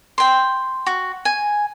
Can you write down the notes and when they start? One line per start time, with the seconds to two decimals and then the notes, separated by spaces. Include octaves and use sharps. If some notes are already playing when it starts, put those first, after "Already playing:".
0.18 G5 C6
0.86 F#4
1.25 G#5